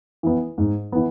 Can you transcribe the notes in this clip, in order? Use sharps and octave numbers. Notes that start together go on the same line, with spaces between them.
E3 B3
G#2
E3 B3